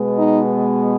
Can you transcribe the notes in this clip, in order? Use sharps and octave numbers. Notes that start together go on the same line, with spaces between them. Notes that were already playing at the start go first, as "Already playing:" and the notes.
Already playing: B2 G#3 B3
D#4